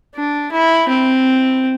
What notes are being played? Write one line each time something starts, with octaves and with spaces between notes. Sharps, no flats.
D4
E4
C4